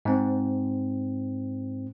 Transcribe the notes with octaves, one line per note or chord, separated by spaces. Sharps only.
G#2 C4